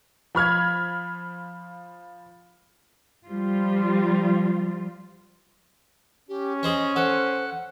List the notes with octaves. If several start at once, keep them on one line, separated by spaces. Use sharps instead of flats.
F3 B5 F6 G#6
F3 G3 F4
C#4 G4
G#4 C5 C#5 D#5
A4 C5 F#5